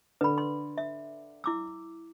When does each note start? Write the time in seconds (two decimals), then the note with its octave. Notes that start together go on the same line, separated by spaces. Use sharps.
0.21 D3 B4 B5
0.38 C6
0.78 E5
1.44 E4 D6 E6